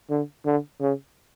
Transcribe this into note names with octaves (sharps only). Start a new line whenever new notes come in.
D3
D3
C#3